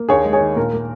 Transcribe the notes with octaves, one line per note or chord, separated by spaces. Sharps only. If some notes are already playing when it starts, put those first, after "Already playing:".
Already playing: A#3
D#2 G#4 C#5
G#3
G#4 C#5
D#3
A#2 A#4
A#3